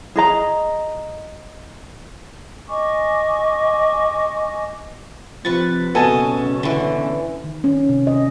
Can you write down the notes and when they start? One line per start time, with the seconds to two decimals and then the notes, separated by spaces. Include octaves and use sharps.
0.16 G#4 D#5 A#5
2.67 D#5 G#5 C#6 D6
5.45 C3 F3 B4 C#6 A6
5.95 F#1 B2 B3 C#4 A4 D#5 G#5 A5
6.63 D3 E3
7.44 D#3
7.64 C#4
7.89 C3
8.07 D#5